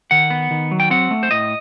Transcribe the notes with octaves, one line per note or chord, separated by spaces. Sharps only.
D#3 F#5
B3
D#3
F#3
G5
C4 F#5
A3
C5
A2 D#5